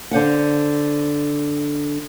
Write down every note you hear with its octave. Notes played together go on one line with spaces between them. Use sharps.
D3 C5 F5 F#5